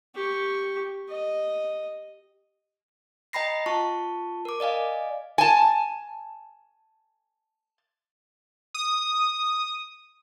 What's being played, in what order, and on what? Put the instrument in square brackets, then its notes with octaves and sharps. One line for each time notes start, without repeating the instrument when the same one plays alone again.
[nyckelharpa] G4 C#6
D#5
[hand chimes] D#5 G5 A#5 B5 A#6 C7
F4 A5 C#6
A#4 D6
D5 D#5 F5 G#5
[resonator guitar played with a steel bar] G#5 A5
[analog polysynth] D#6